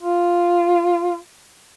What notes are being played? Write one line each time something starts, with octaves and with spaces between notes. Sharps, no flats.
F4